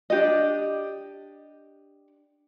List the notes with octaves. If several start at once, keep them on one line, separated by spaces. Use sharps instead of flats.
D4 G4 D#5